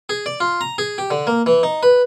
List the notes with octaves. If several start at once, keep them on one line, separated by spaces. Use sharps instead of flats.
G#4
D5
F4
A#5
G#4
G4
D3
A#3
E3
D#4
B4